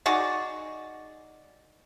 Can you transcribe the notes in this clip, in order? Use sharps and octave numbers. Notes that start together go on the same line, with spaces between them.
D#4 F#4 G#4 D5